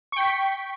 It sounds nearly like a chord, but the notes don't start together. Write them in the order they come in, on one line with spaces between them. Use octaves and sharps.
C#6 G5 B6